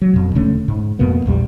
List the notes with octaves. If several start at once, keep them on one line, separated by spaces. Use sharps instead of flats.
F#3
F2 B2
E1 D3 A3 C#4
G#2
F2 B2 A#3 B3
A#1 E2 G3